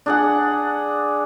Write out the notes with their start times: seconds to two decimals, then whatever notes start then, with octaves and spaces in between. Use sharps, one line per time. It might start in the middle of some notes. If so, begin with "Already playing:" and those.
0.06 D4 G#4 F#5